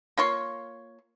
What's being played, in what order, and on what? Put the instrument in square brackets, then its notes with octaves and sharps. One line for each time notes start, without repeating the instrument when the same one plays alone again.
[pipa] A#3 F4 C#5 C6